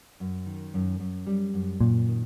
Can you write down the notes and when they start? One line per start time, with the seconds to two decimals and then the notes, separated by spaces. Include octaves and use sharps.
0.20 F#2
0.46 D#3
0.74 F#2
1.00 F#2
1.26 G3
1.54 F#2
1.80 F#2 A#2
2.07 D#3